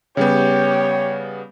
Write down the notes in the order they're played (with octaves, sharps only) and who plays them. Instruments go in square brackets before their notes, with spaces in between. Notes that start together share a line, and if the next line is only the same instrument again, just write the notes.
[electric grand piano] C#3 G3 B3 [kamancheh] G4 [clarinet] C#5